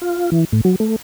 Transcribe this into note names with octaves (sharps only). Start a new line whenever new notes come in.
F4
E3
A2
F#3
A3